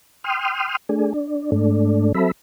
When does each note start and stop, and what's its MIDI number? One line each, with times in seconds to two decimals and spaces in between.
0.24 0.77 79
0.24 0.77 84
0.24 0.77 87
0.24 0.77 89
0.89 1.13 57
0.89 1.13 62
0.89 1.13 68
1.14 1.51 62
1.52 2.12 44
1.52 2.12 57
1.52 2.12 62
2.14 2.31 54
2.14 2.31 60
2.14 2.31 69
2.14 2.31 76
2.14 2.31 83